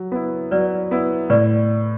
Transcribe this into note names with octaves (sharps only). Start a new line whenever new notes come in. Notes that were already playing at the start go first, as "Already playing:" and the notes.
Already playing: F#3
B3 E4
F#3 B4 D5
B3 E4
A2 B4 D5